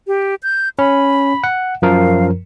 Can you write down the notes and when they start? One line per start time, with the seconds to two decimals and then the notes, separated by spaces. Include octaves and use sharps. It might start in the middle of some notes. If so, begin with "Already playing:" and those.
0.07 G4
0.43 G6
0.79 C#4 B5
1.44 F#5
1.82 F#2 F3 A#4 F5